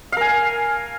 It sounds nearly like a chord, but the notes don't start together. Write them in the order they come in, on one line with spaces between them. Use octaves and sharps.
F5 A#4 G#5